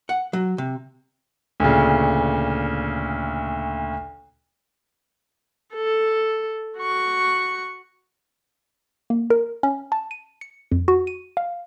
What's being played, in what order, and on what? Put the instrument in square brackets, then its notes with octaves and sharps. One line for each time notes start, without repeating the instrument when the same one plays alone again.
[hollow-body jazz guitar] F#5
F#3
C3
[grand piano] D2 A#2 C#3
[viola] A4
F#4 C#6
[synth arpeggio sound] A#3
A#4
C#4
A5
D#7
C#7
F2
F#4
D#7
F5